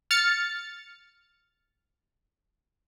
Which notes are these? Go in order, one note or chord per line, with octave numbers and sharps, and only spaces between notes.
F6 A6 C#7